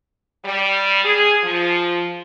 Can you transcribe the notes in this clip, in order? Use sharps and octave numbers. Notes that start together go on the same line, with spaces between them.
G3
G#4
F3